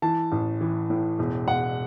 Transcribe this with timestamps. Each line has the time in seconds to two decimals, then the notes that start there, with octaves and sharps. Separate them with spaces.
0.02 E3 A5
0.32 A1
0.61 E3
0.90 A2
1.19 E1
1.48 E1 F#5